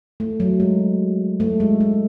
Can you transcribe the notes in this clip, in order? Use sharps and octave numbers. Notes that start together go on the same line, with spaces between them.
A3
F#3
G#3
A3
G#3
G#3